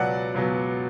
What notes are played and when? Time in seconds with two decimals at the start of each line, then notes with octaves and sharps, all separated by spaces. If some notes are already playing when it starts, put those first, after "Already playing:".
Already playing: C#2 B2 F#3 B3 D5 F#5
0.34 C#2 B2 F#3 B3